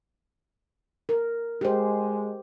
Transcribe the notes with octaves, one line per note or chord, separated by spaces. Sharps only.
A#4
G#3 G4 C5